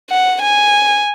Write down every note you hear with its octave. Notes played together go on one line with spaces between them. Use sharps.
F#5
G#5